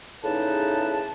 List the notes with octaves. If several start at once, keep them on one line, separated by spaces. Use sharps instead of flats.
E2 A2 C#3 D#4 B4 A5